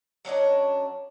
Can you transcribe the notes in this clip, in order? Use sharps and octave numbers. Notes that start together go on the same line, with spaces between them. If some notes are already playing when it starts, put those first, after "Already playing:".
F#3 C#4 D4 D#5